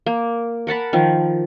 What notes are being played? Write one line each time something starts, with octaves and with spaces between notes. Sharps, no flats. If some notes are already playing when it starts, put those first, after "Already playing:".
A#3
A#4 F#5 A5 B5
D#3 F3